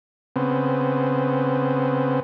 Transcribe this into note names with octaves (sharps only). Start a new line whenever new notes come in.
C#3 B3 C4